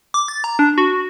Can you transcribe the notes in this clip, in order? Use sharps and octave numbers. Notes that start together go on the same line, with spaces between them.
D6
A6
A#5
D4
F#4